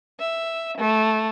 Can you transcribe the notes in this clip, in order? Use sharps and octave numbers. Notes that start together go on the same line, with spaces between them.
E5
A3